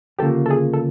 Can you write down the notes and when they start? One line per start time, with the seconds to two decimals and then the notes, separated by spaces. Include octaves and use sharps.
0.19 D2 C#3 F3 A#3 G4 A4
0.46 A4
0.50 G#4
0.73 A4